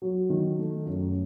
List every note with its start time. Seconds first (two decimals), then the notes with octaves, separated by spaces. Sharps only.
0.02 F#3
0.30 D#3
0.58 A3
0.86 F#2